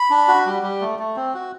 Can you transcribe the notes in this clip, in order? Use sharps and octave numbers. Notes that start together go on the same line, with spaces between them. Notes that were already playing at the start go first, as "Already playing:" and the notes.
Already playing: B5
D4
F#4
G3
G3
A3
A3
C4
F#4